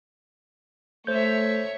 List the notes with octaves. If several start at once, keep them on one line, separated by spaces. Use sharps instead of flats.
A3 C5 C#5 E5 G6